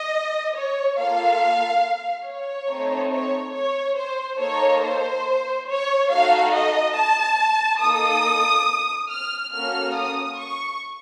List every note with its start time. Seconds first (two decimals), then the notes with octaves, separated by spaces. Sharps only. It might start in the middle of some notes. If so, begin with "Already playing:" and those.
Already playing: D#5
0.55 C#5
0.98 A#3 F4 A4 F5
2.26 C#5
2.69 A3 C4 D#4
3.12 C#5
3.55 C#5
3.98 C5
4.40 A#3 D#4 A4 C#5
4.83 C5
5.69 C#5
6.11 A3 D#4 F#4 A4 F5
6.54 D#5
6.96 A5
7.82 A#3 D#4 A4 D#6
9.10 F6
9.53 A#3 C#4 F#4 A4 F6
9.96 D#6
10.39 C#6